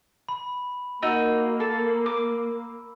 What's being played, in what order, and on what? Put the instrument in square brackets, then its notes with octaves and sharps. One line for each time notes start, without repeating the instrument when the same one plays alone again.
[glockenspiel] B5
[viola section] A#3 [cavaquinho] D#4 F#4 [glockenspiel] E6
[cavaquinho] A4
D6